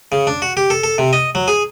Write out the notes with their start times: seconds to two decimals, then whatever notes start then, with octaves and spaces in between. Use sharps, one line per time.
0.12 C#3
0.27 D4
0.42 F#4
0.57 G4
0.70 A4
0.83 A4
0.98 C3
1.13 D#5
1.35 F#3
1.48 G#4